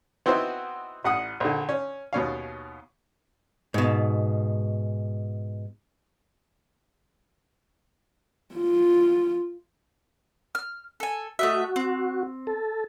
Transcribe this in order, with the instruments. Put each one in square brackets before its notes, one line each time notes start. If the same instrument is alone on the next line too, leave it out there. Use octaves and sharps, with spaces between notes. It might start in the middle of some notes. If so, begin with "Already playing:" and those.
[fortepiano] B3 C4 D#4 E4 F#4 C5
A1 F#5 D#6
A#1 D3
C#4
D#2 B2 C#4 F5
[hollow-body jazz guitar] G#2 B2
[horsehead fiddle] F4
[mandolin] F6
A4 G#5
[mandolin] A3 D#5 E5 [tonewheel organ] F#4
[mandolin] C4
[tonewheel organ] A4